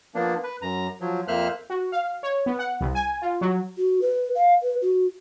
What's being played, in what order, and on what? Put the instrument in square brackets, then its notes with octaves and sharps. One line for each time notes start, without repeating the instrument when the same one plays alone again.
[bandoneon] F3 A#3 B3 D4
B4
F#2 A#5
F3 F#3
F2 A#3 C5 E5 F6 F#6
[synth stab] F#4
F5
C#5
B3
F#5
C2
G#5
F4
F#3
[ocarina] F#4
B4
F5
B4
F#4